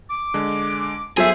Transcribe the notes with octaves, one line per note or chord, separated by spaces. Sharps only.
D6
D3 G#3
F#3 B3 G#4 A4 C5 E5